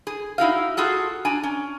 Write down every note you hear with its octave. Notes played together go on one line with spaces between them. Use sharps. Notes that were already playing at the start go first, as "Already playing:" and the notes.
G#4
D#4 E4 F#4 F5
F4 F#4 G#4 A4
D4 G#5 A#5
C#4